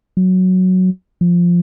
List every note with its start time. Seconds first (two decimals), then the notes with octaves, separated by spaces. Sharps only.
0.17 F#3
1.21 F3